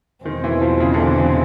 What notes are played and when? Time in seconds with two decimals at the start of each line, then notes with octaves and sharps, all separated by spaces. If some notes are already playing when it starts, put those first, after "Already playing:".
0.25 E2 B2 D#3 G#3 C4
0.44 E3
0.61 F3
0.80 C#3
0.94 D3
0.99 C#3
1.17 C#3